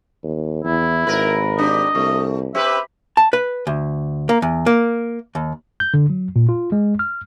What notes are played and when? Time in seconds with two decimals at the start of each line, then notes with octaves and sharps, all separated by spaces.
0.23 D#2
0.64 E2 E4
1.07 G#1 A#4 B4
1.58 D4 G4 D#5
1.95 C2 A3
2.55 C4 G4 B4 E5
3.17 A5
3.33 B4
3.67 D2
4.29 A#3
4.42 E2
4.66 A#3
5.35 D#2
5.80 G6
5.94 D3
6.10 F#3
6.36 A#2
6.49 F4
6.72 G#3
6.99 F6